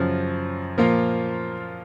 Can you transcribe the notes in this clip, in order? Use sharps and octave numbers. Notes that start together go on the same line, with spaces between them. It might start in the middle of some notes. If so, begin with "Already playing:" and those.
Already playing: F#2 C#3 F3
A#2 F3 A#3 F4